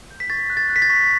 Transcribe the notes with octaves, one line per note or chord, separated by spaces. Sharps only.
G6
B6
C#6 A6
F#6
A6
F#6
B6
A6
C#6